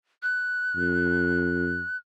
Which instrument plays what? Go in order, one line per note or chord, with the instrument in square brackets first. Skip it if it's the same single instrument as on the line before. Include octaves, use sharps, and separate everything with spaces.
[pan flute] F#6
[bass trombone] F2